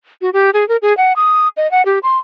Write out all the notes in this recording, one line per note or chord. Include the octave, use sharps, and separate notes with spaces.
F#4
G4
G#4
A#4
G#4
F#5
D#6
D#5
F#5
G4
C6